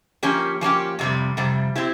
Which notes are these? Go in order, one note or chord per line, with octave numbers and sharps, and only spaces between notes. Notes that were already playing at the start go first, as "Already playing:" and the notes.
F3 A#3 C#4 G4
F3 A#3 C#4 G4
F2 C3 G3
F2 C3 G3
C4 E4 G4